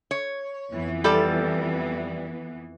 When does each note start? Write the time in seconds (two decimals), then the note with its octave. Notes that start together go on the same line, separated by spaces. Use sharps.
0.11 C#5
0.72 F2 E3 B3
1.04 G3 A4 D5